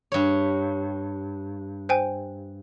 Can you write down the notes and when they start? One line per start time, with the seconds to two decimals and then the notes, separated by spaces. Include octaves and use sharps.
0.12 G2 C#5
1.89 C5 G5 G#5